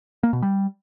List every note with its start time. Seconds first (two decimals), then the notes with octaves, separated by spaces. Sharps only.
0.23 A#3
0.33 B2
0.42 G3